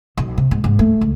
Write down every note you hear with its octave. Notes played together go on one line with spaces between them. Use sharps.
B1
C3
G#2
G#2
A3
C#2